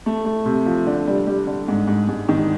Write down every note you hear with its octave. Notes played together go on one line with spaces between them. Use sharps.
A3
A3
C3
F3
D3
G3
G3
D3
G#2
G#2
G#2
D#3